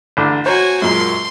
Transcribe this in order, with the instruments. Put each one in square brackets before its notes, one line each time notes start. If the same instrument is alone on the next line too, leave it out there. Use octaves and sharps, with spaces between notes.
[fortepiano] A1 D3 D4
[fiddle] F#4 G#5 [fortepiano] C5 C#5 A#5
[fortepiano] F#2 A#2 G#3 [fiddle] C6